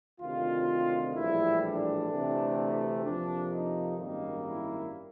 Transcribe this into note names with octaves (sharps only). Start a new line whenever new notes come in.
D2 C3 D#3 F4
A#1 A2 E3 G3 E4
D4
D2 C3 E3 A3
F2 C3 F3 A#3 D4
D#4
G#1 F#2 D#3 G3 A#3 D#4
E4